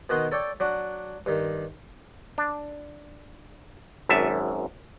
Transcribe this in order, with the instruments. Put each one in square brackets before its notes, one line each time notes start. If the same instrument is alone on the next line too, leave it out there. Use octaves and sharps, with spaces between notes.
[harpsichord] B2 D#3 F#4 D#5 C6
A4 C#5 D5 G5
F#3 D4 F#4
G2 D#3
[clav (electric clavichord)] D4
G#1 F#2 E5 A5